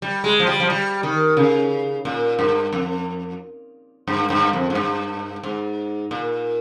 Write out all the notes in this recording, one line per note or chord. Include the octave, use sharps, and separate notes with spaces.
G3
G#3
F3
G3
F3
G3
D#3
C#3
A#2
G2
F2
G2
G2
F2
G#2
G2
G#2
A#2